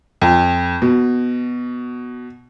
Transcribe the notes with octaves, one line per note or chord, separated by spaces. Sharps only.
F2
B2